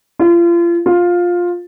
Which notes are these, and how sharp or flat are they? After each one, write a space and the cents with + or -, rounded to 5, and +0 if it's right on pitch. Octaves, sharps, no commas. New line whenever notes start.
F4 -35
F4 +10